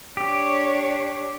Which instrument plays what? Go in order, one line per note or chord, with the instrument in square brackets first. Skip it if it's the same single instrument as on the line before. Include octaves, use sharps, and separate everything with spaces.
[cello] D4 C#5 [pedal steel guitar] G4